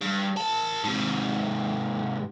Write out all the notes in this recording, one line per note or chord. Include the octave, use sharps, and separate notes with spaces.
G2
A#4 A5
G#2 C3